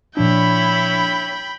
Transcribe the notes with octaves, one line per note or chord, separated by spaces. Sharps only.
A#2 F3 D4 E4 C#5 G5 B5